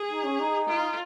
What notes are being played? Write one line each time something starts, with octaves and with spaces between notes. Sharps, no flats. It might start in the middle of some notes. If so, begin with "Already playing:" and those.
Already playing: G#4
D#4
C#4
D#4
F4